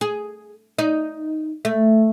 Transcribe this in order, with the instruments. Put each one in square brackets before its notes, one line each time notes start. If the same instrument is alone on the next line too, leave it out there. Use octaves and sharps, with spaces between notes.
[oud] G#4
D#4
A3